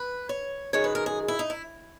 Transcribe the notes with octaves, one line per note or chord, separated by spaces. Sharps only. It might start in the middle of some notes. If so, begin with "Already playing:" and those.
Already playing: B4
C#5
F#2 D#3 G#3 C#5
B4
A#4
G#4
E4
D#4
E4